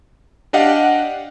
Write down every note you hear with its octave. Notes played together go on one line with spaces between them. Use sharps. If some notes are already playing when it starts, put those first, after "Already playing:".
D4 G4 D#5 F5 F#5